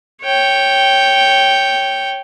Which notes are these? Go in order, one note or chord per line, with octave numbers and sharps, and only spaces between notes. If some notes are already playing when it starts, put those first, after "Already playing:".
C#5 G5